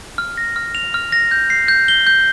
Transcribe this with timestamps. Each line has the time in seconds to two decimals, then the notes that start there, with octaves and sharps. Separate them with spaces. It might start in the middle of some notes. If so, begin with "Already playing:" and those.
0.18 F6
0.37 A#6
0.56 F6
0.75 F7
0.94 F6
1.12 A#6
1.31 G6
1.50 C7
1.68 G6
1.88 G7
2.07 G6